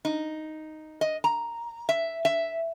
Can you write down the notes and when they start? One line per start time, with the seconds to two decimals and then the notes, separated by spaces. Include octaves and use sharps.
0.05 D#4
1.01 D#5
1.24 A#5
1.89 E5
2.25 E5